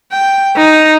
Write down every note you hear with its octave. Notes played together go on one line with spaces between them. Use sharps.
G5
D#4